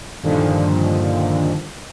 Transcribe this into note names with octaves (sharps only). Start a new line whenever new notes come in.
G2 A#2 D3 D#3 F3